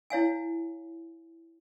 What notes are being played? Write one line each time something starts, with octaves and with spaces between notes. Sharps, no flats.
E4 C#5 F5 G#5